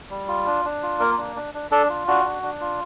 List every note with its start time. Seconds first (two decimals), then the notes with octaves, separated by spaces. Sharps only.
0.10 G3
0.28 F4
0.47 D4
0.65 D4
0.83 F4
1.00 A#3 A#4
1.17 D4
1.36 D4
1.54 D4
1.71 D4 A4
1.90 F4
2.07 D4 F#4
2.25 D4
2.43 D4
2.61 F4